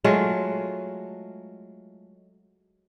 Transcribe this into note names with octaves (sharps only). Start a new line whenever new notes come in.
F#3 G#3 A3 F4